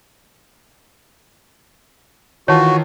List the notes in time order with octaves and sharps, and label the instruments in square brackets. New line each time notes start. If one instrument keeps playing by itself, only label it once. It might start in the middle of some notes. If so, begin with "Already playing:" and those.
[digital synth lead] D#3 [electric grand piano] E3 F4 [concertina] F#4 [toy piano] C#5 A5